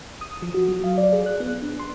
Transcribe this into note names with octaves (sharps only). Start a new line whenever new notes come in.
D#6
F3
F#4
F#3
F5
D5
G#4
F#6
B3
D4
C6